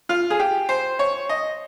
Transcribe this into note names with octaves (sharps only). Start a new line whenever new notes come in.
F4
G#4
G4
C5
C#5
D#5